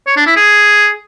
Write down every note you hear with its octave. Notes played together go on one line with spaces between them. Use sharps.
C#5
D4
E4
G#4